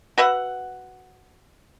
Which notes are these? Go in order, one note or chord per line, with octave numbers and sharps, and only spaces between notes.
F#4 B4 E5 F#5